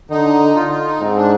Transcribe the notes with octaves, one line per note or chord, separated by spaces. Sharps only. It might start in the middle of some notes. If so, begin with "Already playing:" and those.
D3 D#4
F4
F4
D#4
G#2 C4
D4